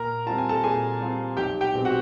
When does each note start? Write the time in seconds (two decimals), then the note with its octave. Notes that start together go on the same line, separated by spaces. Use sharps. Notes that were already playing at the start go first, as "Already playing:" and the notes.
Already playing: A#2 A#4 A#5
0.26 G3 C4 F4 A5
0.38 G#5
0.49 A4 A5
0.63 A#2 G#4 G#5
1.00 G3 C4 F4
1.37 B1 G4 G5
1.61 G4 G5
1.74 B2 G#3 C4
1.85 F#4 F#5